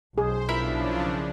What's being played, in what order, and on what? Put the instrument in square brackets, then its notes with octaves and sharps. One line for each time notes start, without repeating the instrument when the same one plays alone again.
[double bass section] B1 [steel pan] G#4 [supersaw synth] C5
[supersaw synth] C#3 F3 D4 [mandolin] E4 A#4 E5 [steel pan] F4